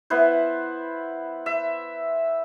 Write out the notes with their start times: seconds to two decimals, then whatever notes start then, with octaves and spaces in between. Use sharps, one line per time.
0.10 B3 E4 B4 C5
1.46 E5